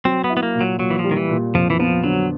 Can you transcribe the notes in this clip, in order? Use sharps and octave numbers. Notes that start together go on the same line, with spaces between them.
F#3 C4
B3
E4
B3
A#3
A#2
F#3
A#2 F#3
E3
F3
G3
D#3
E3
A#2
F2 F3
E3
F3 B3
D3 F#3